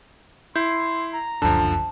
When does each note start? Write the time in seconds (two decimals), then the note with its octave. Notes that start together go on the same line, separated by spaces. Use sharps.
0.56 E4 C6 G6
1.13 A#5
1.42 F1 C#2 F#2 D3 F3 A5